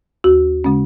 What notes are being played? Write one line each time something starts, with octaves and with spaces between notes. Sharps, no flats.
D#2 F#4
C#3 G#3 C#4